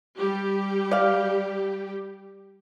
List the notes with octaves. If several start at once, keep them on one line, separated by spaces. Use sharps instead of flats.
G3 G4
D5 F5